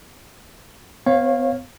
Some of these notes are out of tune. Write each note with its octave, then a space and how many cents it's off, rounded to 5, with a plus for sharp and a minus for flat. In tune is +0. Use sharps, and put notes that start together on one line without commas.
B3 +35 C#5 -25 F5 +0